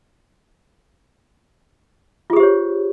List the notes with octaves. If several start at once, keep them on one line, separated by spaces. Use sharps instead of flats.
F4 G4 G#4 C5 C#5